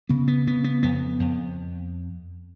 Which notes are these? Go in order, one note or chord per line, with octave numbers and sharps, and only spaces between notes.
C#3 B3
B3
C#3 B3
B3
F2 B3
F2